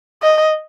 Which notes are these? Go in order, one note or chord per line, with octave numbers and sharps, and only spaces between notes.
D#5